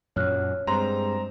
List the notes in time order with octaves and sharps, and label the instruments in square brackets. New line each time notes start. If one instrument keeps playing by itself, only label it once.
[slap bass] F#2 A#2 F#3 [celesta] C#5 F6 F#6
[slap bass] G2 [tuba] G#3 [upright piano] C4 A#5 [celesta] C6